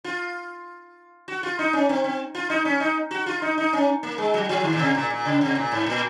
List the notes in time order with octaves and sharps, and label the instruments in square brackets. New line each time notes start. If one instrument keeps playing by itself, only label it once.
[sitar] F4
F#4
F4
D#4
C#4
C4
C4
F4
D#4
C#4
D#4
F#4
F4
D#4
D#4
C#4
A#3
G#3
F#3
F3
D#3
A#2
C3
A#2
A#2
C#3
C3
A#2
G#2
A#2